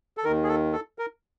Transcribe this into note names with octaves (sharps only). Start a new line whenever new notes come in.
A4
D#2 D#3 A#4
G#4
A4
A4
A#4